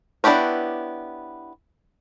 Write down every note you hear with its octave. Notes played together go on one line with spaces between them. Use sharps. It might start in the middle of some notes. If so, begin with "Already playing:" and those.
B3 D4 E4 G4 C#5